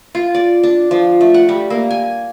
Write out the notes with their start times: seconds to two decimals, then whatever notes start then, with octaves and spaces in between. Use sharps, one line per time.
0.15 F4
0.35 D5
0.63 D4
0.91 F3
1.21 A3
1.34 F#5
1.49 G3
1.70 A#3
1.91 G#5